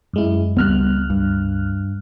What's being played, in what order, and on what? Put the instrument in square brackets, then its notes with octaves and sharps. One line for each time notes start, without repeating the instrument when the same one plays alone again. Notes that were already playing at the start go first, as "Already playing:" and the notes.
[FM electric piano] F#2 G#3 E4
[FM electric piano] C#2 F6 F#6 [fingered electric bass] G3 B3
[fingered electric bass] G2